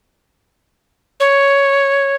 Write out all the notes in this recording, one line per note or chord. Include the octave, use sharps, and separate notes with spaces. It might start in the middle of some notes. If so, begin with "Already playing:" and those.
C#5